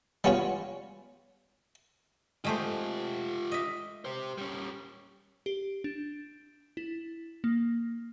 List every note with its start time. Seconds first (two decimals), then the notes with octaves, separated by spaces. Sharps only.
0.24 G3 B3 C#4 F4 F#4 C#5
2.44 G#3 A3 F4 G4 C5
3.51 D#5 E5
4.05 G4 C5
4.38 G3 C#4
5.46 G4
5.84 D4
6.77 E4
7.44 A#3